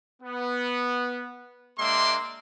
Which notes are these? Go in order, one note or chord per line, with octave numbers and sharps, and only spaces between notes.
B3
G#3 A#3 D4 E5 C6 D6